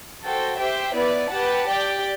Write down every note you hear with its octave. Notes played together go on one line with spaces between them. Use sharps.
F#4 A4 C5 G5
G4 C5 E5 G5
B3 E4 B4 D5
G4 B4 F#5 A5
G4 D5 G5